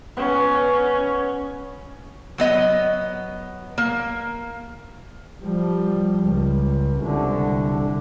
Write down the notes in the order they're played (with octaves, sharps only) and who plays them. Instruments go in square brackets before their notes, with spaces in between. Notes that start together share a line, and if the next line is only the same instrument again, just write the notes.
[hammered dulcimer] B3 [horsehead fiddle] C#4
[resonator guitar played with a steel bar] F#3 B3 D#5
A#3
[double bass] F3 G3
C#2
C2 D3